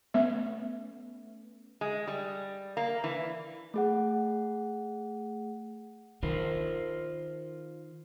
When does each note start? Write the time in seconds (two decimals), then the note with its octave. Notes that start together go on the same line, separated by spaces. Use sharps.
0.14 A3 B3 C#4 E5
1.81 G#3
2.07 G3
2.77 A#3
3.04 E3
3.74 A3 G#4 F#5
6.23 D#3 F4 A#4 C5